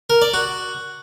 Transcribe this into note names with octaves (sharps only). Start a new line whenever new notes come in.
A#4
D5
F#4